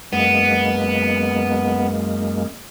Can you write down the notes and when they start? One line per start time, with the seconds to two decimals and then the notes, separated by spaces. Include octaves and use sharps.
0.13 F#2 G#3 A#3 B3